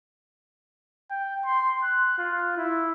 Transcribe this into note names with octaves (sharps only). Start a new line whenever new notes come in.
G5
C6
F#6
F4
E4